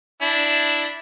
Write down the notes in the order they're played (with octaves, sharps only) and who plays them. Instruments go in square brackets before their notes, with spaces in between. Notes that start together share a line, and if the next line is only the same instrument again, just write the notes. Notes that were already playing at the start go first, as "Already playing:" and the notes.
[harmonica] D4 E4